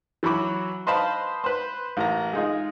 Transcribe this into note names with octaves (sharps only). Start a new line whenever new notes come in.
E3 F#3 F#4 B5 D6
B4 C5 D#5 F5 A5 B5
B4 C5
A1 A#4 A#5
G#3 D#4 F4 G#4